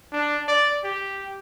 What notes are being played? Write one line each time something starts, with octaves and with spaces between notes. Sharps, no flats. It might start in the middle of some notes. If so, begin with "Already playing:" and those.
D4
D5
G4